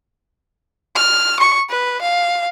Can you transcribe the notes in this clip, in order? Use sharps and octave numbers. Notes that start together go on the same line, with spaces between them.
F6
C#6
B4
F5